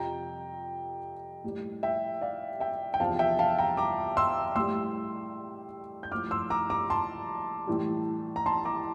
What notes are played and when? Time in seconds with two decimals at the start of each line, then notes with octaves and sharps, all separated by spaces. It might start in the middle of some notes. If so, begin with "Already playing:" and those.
Already playing: F2 C3 F3 G5 A#5
1.44 A2 G3
1.83 E5 G5
2.21 D5 F5
2.60 E5 G5
2.94 G5
3.00 E2 C3 F3 F5 A5
3.19 E5 G5
3.39 F5 A5
3.58 G5 A#5
3.77 A#5 D6
4.17 C6 E6
4.55 A2 G3 C6 E6
6.03 G6
6.12 A2 F3 D6 F6
6.31 C6 E6
6.50 A#5 D6
6.70 A#5 D6
6.90 A5 C6
7.67 A2 E3 G3
8.36 A#5
8.46 A5 C6
8.65 A#5 D6